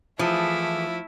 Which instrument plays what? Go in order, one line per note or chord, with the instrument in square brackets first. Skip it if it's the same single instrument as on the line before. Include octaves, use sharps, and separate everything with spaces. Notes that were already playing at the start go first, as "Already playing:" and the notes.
[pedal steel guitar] E3 G#4 A4 [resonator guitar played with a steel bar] F3 [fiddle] A3 E4